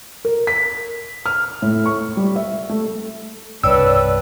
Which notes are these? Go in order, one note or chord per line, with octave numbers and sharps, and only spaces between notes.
A#4
B6
F6
A2
C#6
G3
E5
A3
C2 G2 D4 B4 C#5 D5 G5 E6